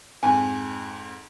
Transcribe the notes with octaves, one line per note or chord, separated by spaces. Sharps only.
F2 G#2 G#5